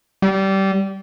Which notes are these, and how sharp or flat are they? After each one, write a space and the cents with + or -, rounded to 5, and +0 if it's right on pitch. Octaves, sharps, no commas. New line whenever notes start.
G3 -20